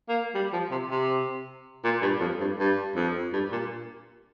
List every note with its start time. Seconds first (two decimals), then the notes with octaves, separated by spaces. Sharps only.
0.09 A#3
0.35 G3
0.53 F3
0.71 C3
0.90 C3
1.84 A#2
2.02 G2
2.21 F2
2.41 G2
2.59 G2
2.96 F2
3.33 G2
3.52 A#2